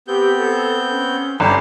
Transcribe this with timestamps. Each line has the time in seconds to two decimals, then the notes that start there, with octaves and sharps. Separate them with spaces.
0.08 B3 C4 G4 G6
0.37 A4
0.90 C#4
1.40 G1 D4 G4 G#5